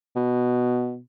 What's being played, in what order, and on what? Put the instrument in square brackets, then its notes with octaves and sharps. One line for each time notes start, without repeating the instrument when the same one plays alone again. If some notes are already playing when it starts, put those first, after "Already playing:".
[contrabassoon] B2